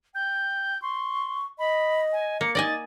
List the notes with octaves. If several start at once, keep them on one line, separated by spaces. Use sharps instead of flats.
G5 G6
C6 C#6
D#5 B5
G#5
A#3 C#7
D#4 D5 D#5 G#5 A6